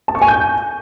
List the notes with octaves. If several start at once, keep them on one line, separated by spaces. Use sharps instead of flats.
A5
C#6
G#5
G6